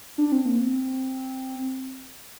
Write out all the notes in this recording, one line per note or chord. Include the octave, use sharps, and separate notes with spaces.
D4
C4
A#3
C4